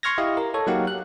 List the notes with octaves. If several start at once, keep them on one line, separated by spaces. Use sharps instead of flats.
C6 C#6 F6 G#6 A#6
E4 G4 D#5 F5
A#4
A4 C#5
F#3 A#3 D#4 G4 F5 F#5
F#6